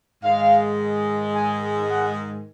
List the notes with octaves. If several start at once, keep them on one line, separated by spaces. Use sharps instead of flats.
G#2 D#3 G#3 F5
G#5
F#5